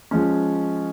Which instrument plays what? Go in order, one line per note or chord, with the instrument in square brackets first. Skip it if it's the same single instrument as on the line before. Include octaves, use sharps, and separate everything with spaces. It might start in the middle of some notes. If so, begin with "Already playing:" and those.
[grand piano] F3 G#3 C#4